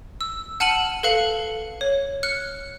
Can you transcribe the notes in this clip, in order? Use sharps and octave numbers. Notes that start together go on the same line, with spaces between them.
E6
F#5 A5 F6 C#7 D#7 F#7
A4 B4 F5 C#7 F#7
C#5
F6 F#6 C#7